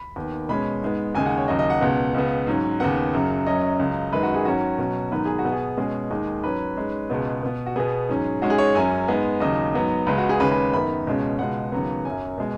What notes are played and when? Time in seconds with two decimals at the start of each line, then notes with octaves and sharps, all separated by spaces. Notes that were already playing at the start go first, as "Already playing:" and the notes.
Already playing: B5
0.16 D#2 D#3 B3
0.49 B2 G#3 C#4 B5
0.82 G#2 G#3 B3
1.15 D#2 C#3 G#3 G#5
1.26 F#5
1.37 C#5
1.48 D#2 C#3 F#3 D#5
1.59 D#5
1.70 F#5
1.81 C#2 B2 B3 F#5
2.14 C#2 C#3 B3
2.47 G#2 F#3 C#4
2.80 D#2 C#3 B3 F#5
3.13 F#2 C#3 F#3
3.47 F#2 F#3 C#4 D#5
3.79 C#2 C#3 F#3
4.12 F#2 D#3 G#3 B4
4.23 F#4
4.34 G#4
4.45 G#2 D#3 F#3 C#4 F#4
4.78 B2 F#3 C#4
5.11 G#2 D#3 F#3 B3 B4
5.25 G#4
5.39 F#4
5.45 B2 B3
5.52 G#4
5.78 B2 G#3 C#4 G#4
6.11 D#2 D#3 G#3
6.44 G#2 F#3 C#4 B4
6.77 G#2 G#3 C#4
7.10 C#2 B2 G#3 B3
7.43 B2 B3
7.66 F#4
7.76 B2 B3 G#4
8.09 G#2 F#3 C#4
8.42 G#2 G#3 C#4 F#4
8.50 G#4
8.58 C#5
8.75 F#2 F#3 C#4 G#5
9.08 G#2 G#3 B3
9.40 D#2 C#3 F#3 D#5
9.74 G#2 F#3 B3
10.07 C#2 C#3 G#3 B4
10.18 F#4
10.29 G#4
10.40 D#2 C#3 G#3 C#4 B4
10.51 B4
10.73 F#2 D#3 B3 B5
11.07 C#2 B2 G#3 C#4
11.39 C#2 B2 G#3 F#5
11.72 D#2 C#3 F#3 B3
12.05 F#2 F#3 C#4 G#5
12.38 B2 G#3